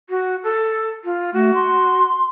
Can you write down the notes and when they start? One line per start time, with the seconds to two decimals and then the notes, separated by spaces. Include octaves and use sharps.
0.10 F#4
0.44 A4
1.04 F4
1.33 A3 F#4
1.54 C6